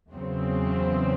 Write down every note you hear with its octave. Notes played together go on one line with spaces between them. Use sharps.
E2 C#3 F#3 C4